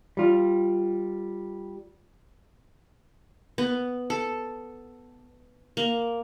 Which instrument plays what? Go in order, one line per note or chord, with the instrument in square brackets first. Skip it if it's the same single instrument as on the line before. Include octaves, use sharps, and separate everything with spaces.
[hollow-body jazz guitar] G3 F4
[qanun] B3
A4
A#3